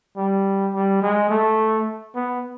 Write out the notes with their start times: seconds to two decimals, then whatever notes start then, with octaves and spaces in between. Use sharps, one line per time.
0.17 G3
0.74 G3
1.02 G#3
1.30 A3
2.15 B3